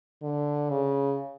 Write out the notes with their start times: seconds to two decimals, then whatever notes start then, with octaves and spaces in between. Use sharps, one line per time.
0.22 D3
0.70 C#3